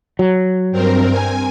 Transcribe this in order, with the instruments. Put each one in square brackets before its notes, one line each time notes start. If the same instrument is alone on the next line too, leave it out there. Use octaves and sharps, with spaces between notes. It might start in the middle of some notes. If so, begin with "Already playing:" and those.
[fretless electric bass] F#3
[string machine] G2 C4 A#4
G#5